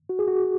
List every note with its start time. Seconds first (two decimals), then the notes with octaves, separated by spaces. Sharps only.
0.09 F#4
0.19 G#4
0.28 F#4